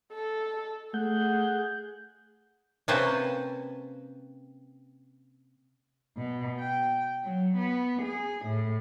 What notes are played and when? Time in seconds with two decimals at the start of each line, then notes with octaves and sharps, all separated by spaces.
0.13 A4
0.94 A3 G#4 F#5 G6
2.88 C3 A#3 C#4 B4 C5 A5
6.17 B2
6.59 G5
7.24 F#3
7.57 B3
8.02 G#4
8.45 A2